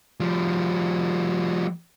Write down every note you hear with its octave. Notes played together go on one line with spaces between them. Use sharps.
F3 G3